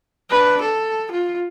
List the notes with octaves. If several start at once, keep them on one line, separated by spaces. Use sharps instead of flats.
D4 B4
A4
F4